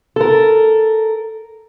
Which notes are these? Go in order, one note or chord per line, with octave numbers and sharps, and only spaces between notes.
A4 A#4